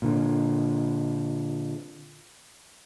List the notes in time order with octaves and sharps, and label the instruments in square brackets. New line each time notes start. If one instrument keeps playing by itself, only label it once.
[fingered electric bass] A#2 D3